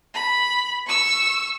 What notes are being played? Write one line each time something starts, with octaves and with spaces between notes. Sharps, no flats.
B5
C#6 E6